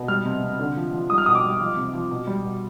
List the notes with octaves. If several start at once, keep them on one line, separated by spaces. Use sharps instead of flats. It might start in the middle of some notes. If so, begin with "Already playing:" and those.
Already playing: B2
G3 F6
C3
C3
D3
F3
F3
G3 D#6
F6
B2 D#6
D6
G3
F3
C3
F3
B2
G3
B2